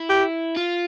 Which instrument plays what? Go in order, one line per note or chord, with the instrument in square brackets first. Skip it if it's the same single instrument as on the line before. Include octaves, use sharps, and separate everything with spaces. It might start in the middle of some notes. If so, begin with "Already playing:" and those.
Already playing: [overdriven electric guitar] E4
[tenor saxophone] G4
[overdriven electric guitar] F4